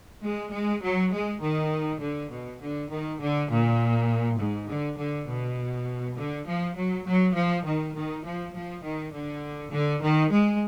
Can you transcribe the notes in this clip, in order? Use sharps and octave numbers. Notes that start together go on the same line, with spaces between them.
G#3
G#3
F#3
G#3
D#3
D3
B2
D3
D#3
D3
A#2
G#2
D3
D3
B2
D3
F3
F#3
F#3
F3
D#3
D#3
F3
F3
D#3
D3
D3
D#3
G#3